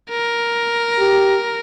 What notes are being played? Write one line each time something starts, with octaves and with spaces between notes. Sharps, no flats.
A#4
G4